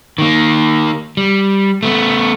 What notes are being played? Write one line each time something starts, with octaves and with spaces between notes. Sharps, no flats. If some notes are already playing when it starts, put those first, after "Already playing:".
D#3 A#3
G3
A3 B3